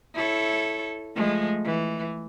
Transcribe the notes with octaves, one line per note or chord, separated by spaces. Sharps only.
E4 A4 C#5
F3 G#3 A3
E3